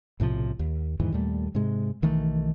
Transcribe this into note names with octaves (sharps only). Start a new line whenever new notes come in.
B1 A2 C3 F3
D#2
E2 G#2 D#3 E3
D#2 A#2 G3 A3
G#2 C3 G#3
B1 D#3 E3 A3